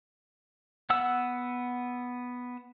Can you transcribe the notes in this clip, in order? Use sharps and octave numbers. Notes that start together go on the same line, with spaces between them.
B3 F#5 E6